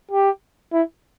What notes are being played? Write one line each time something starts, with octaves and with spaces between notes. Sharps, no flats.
G4
E4